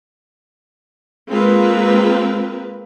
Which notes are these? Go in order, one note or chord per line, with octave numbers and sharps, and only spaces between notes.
G#3 A#3 C4 F4 A#4 B4